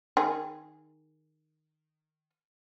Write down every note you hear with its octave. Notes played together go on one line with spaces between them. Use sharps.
D#3 G#4